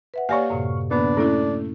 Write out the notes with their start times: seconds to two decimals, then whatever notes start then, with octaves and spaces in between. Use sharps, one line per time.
0.14 B4 E5 F#5
0.29 A#3 G4 C#5 D5 F5 G#5 C#6
0.50 F#2 A2 C3
0.91 D3 A#3 B3 D4
1.17 A3 C#4 E4 A4